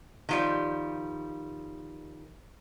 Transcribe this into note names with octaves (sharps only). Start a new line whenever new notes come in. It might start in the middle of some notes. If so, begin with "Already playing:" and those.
D#3 F3 G3